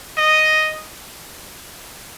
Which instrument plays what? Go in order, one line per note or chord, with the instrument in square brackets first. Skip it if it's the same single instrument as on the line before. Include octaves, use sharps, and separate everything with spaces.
[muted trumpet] D#5